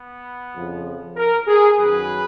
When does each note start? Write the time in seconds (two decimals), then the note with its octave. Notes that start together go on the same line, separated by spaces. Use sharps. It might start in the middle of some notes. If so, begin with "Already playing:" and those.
Already playing: B3
0.55 F2 C#3 F3
1.17 A#4
1.47 G#4
1.78 F#2 D#3 F#3 B4